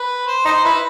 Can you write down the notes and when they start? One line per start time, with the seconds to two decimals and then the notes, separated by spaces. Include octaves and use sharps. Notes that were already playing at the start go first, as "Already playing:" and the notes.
Already playing: B4
0.27 C5
0.45 D#4 C5
0.64 E4 B4